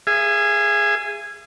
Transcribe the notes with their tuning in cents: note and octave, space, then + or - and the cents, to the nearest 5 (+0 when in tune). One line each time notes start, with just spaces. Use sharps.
G#4 -5 E5 +40